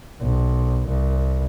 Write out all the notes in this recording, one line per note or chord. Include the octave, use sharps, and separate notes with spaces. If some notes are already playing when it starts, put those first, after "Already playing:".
B1
C2